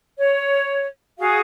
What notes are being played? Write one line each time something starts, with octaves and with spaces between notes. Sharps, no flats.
C#5
F#4 G#4 F5